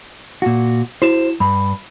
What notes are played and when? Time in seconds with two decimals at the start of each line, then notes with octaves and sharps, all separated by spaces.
0.42 A#2 F#4
1.02 E4 F#4 C5 E7
1.40 G2 B5